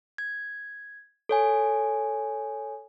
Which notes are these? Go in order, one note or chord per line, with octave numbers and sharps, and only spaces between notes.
G#6
A4 C#5 G#5